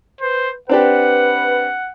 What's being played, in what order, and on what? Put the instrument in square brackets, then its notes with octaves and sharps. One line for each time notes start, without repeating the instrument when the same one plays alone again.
[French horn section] B4 [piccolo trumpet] C5
[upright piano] C4 D4 G4 [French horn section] B4 [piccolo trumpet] F#5